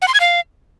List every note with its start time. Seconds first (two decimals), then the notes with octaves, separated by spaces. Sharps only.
0.02 F#5
0.08 C6
0.14 G#6
0.20 F5